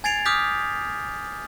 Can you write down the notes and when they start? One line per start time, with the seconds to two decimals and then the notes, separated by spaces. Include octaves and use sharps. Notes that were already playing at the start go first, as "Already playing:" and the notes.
0.04 G#5 G#6 A6 C7 D7 F7
0.25 D6 D#6 F6 G6 B6